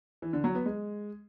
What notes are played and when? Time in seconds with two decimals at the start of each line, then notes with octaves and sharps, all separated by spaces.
0.22 E3
0.33 D3
0.44 F#3
0.55 B3
0.66 G#3